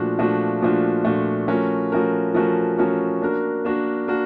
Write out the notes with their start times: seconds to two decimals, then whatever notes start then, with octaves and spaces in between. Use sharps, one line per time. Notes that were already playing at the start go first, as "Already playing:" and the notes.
Already playing: A#2 F3 A3 D4 F#4
0.18 A#2 F3 A3 D4 F#4
0.62 A#2 F3 A3 D4 F#4
1.05 A#2 F3 A3 D4 F#4
1.48 F3 A3 C#4 F#4 A#4
1.92 F3 A3 C#4 F#4 A#4
2.34 F3 A3 C#4 F#4 A#4
2.78 F3 A3 C#4 F#4 A#4
3.22 A#3 D4 F#4 A#4
3.65 A#3 D4 F#4 A#4
4.08 A#3 D4 F#4 A#4